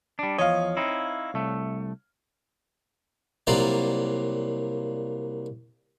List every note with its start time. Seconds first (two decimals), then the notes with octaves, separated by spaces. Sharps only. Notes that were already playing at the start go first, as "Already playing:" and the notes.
0.19 G3 D4
0.38 E2 F3 C#5 D#5 F5
0.77 C4 D#4 E4
1.34 C2 A3
3.47 C2 F#3 A#3 F4 D5